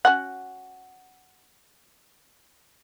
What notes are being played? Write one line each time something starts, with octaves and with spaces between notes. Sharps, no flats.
C#4 F#4 F#5